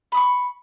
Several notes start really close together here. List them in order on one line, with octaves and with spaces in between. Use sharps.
B5 D#6 C#6